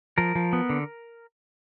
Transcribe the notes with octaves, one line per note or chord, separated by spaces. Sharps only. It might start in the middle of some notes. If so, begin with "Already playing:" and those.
F3 A#4
F3
B3
D3